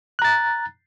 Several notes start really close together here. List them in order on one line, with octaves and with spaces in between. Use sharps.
F#6 A#5 A6